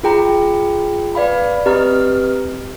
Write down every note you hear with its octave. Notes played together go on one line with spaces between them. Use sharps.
F4 G#4 G5 A#5
B4 D5 F5 B5
C4 G4 B4 D#5 A#5 F6